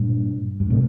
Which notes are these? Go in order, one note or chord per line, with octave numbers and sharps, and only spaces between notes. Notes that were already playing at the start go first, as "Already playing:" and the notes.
Already playing: G2 A#2
G2
A2 C3